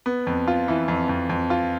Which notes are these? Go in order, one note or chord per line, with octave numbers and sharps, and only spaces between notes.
B3
F2
F4
E3
F2
F2
F2
F4